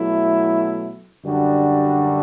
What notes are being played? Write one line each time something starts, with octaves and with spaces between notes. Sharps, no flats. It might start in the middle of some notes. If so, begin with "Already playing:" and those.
Already playing: B2 F#3 A3 E4
F#2 D3 G3 D4 F#4